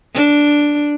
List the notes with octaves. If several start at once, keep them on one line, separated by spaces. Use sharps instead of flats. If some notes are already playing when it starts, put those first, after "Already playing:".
D4